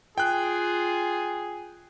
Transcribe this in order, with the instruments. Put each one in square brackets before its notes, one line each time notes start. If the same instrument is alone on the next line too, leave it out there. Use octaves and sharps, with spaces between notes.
[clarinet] F4 [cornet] G#4 [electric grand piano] G5 F#6